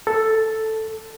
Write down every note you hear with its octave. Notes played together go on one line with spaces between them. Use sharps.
A4